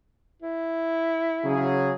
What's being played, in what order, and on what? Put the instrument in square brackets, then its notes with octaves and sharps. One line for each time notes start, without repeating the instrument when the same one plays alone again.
[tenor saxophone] E4
[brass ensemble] C#3 F#3 G#4